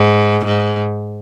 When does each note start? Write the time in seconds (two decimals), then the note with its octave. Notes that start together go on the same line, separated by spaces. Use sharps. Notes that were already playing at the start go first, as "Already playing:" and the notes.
Already playing: G#2
0.45 G#2